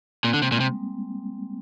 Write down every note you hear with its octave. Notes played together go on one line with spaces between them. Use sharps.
A#2 C4
D3 A#3
C3 G#3
A#2
C3 G3